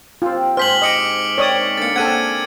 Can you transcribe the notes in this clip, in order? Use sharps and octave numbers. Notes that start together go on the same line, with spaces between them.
C4 F4 G4
G#2 G4 G#4 C5 F6 B6 F#7
D#5 D6 C#7 D7
C4 D#4 A#4 C#5 D5 D#6
D3 A#3 A6 C#7
C#3 C4 A4 F#5 G#6 D#7